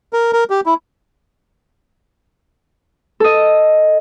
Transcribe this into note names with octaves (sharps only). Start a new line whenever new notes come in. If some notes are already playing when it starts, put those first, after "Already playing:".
A#4
A#4
G4
E4
A4 D#5